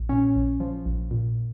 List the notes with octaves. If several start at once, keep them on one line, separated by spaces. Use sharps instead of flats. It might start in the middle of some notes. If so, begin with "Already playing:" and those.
Already playing: A#1
A#2 C#4
A#1
F3
A#1
A#2